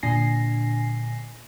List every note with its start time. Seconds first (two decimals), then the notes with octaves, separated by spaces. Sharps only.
0.03 A#2 D3 D4 G#5 A#6 C7